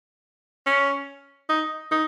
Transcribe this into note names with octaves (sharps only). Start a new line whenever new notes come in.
C#4
D#4
D#4